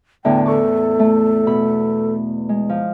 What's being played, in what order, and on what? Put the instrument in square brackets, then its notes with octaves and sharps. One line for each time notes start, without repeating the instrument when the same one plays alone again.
[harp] E2 A2 D3 [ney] G5
[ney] A4 [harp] C#6 D6
[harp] A3
B2 B5
G#3
F3